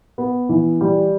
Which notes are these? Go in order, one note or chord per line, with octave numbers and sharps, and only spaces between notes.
B3
E3
G3